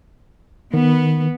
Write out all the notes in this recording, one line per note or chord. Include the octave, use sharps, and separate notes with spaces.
D#3 B3